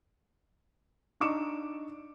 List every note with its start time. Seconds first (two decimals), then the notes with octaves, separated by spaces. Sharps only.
1.20 D4 D#4 C#6 D6 C#7 E7